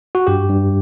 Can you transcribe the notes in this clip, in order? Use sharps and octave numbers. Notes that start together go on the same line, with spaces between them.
F#4
G2 G4
G2